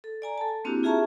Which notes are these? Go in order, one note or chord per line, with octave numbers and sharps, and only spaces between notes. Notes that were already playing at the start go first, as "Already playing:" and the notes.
A4
D5 G#5 A#5
A4 A5
A#3 C4 D4 E4 F#4 G4
F4 G#4 E5 A5 A#5 C#6